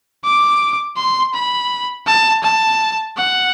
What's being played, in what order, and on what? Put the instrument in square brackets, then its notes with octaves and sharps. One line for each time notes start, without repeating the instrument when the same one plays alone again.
[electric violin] D6
C6
B5
A5
A5
F#5